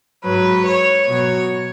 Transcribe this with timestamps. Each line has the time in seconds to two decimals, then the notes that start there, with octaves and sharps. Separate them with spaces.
0.24 G#2 F#3 B4
0.65 C#5
1.07 B2 F#3 C#5